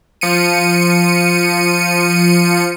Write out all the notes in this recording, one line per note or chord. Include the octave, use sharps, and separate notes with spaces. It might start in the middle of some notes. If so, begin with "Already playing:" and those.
F3 C#7 D#7